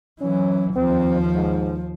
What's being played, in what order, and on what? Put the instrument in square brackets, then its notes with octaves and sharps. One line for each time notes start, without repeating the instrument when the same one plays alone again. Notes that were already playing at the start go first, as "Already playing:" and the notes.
[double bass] E3 F#3 [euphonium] C#4
[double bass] D#2 F3 [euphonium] C4
[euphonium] G#2